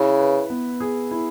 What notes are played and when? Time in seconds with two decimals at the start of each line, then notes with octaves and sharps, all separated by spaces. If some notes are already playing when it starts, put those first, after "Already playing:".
Already playing: C#3 E4
0.19 B4
0.50 B3
0.80 G#4
1.11 E4